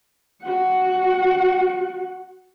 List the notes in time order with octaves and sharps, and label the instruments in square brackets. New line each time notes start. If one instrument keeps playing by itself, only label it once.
[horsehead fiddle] F#4 F#5